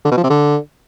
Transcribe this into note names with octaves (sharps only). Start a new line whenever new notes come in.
D3
B2
F3
C3
D3